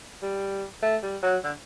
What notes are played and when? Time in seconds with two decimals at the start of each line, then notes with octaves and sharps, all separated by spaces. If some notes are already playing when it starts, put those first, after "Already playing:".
0.22 G3
0.82 A3
1.03 G3
1.23 F#3
1.44 D3